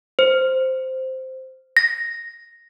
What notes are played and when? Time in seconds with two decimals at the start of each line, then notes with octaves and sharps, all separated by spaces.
0.19 C5
1.77 A#6